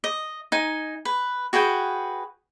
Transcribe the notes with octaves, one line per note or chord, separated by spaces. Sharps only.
D#5
D#4 G#5
B4
F#4 G#4 B4 G5